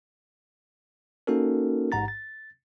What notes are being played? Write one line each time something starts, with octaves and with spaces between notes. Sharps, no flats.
A#3 C#4 D#4 F#4 A4 A#4
A1 G#2 F#5 A#5 A6
A6